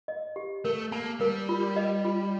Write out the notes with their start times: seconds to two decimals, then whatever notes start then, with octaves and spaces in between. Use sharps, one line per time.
0.08 D#5
0.36 G4
0.65 A3 A#4
0.92 A#3 A5
1.20 G3 A#4
1.49 F4
1.76 D#5
2.05 F4